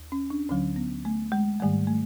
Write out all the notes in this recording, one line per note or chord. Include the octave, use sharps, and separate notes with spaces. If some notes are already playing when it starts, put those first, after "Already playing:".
Already playing: D#2
C#4
D4
D2 D3 F#3 C#4
B3
A3
G#3
G#2 D#3 G3 A3
A3